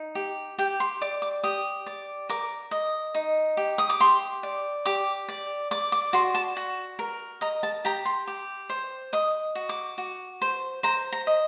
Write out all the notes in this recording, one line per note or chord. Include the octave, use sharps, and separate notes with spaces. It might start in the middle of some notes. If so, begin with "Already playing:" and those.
Already playing: D#4
G4
G4 G5
C6
D5 D6
D6
G4 D#6
D5
A#4 D6
D#5
D#4
G4
D#6
D6
G4 C6
D5
G4 D6
D5
D5 D6
D6
F#4 C6
A5
F#4
A#4
D#5 A#5
A5
G4 A#5
C6
G4
C5
D#5 D#6
F#4
D6
F#4
C5
C5 A#5
A#5
D#5